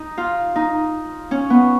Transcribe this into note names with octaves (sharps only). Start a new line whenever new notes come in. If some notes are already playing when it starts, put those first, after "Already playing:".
Already playing: D#4
F4
D#4
C#4
B3